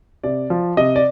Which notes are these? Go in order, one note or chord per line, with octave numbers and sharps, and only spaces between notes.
C3 D5
F3
C3 D#5
D5